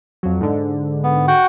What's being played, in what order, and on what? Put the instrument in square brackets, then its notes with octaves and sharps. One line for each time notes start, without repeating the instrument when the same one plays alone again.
[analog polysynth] F2 F#3
G#2 D3
[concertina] B3
F#4 F#5 G5